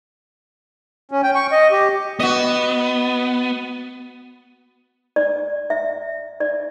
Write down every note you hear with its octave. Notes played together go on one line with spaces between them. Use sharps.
C#4
G5
C#6
D#5
G4
B3 F#4 D#5
D5
E5
D5